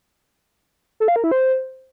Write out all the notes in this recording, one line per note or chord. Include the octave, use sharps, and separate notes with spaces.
A4
F5
A#4
E4
C5